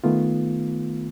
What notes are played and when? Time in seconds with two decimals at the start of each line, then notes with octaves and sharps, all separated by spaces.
0.04 D#3 A3 B3 F4